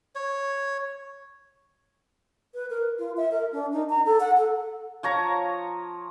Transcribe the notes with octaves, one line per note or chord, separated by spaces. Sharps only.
C#5
B4
A#4
F4
E5
A#4
D4
D#4
A#5
A4
F#5
A4
F3 C#5 A#5